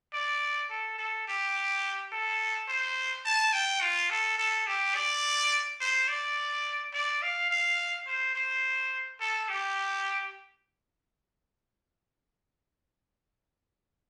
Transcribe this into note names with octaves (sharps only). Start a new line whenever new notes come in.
D5
A4
A4
G4
A4
C5
A5
G5
F4
A4
A4
G4
D5
C5
D5
D5
F5
F5
C5
C5
A4
G4